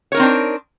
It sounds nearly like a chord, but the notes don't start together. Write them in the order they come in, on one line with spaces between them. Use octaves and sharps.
C#5 A#4 D#4 C4 D4